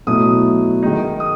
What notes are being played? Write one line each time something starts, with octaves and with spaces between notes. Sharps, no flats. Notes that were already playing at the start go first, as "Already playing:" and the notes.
B2 F#3 A3 E4 D#6
D#3 G#3 D#4
D#6